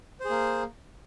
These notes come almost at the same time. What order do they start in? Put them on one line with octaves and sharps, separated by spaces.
C5 G#4 A#3